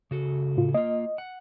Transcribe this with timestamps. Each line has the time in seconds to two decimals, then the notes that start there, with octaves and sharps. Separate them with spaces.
0.11 C#3 F#4 A4
0.57 A2 F4
0.74 A#3 F4 D#5
1.18 F#5